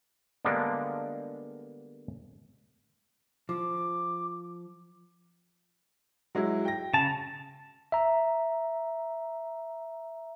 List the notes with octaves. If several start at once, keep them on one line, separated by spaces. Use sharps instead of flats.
D3 G3 G#3 A#3 B3 D4
F3 D6
F#3 G#3 E4
G5 A#6
C#3 A5 F7
E5 A#5